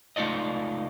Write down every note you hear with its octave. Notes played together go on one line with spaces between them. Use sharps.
C#2 A3 D#4 F4 D5 D#5